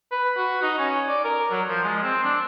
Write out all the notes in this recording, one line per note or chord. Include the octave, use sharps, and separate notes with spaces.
B4
F#4
D#4
C#4
D5
A#4
F#3
F3
G#3
C4
D4